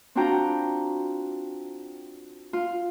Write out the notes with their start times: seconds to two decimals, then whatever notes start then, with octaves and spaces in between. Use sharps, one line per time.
0.15 C4 D4 F4 F#4 G5 A#5
2.53 F4